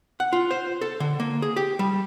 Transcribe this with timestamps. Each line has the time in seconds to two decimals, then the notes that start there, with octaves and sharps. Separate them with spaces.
0.20 F#5
0.33 F4
0.51 C5
0.81 A4
1.00 D3
1.20 A#3
1.42 G#4
1.56 G4
1.79 G3